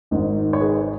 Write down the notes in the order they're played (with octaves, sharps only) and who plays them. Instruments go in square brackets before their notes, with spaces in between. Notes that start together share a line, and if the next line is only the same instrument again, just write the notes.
[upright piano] G#1 G#2 D#3
C#5
G#4 B4